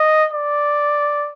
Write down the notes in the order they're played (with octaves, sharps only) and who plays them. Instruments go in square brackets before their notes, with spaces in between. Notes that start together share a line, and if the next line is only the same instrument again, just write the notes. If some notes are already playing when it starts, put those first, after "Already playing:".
Already playing: [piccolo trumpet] D#5
D5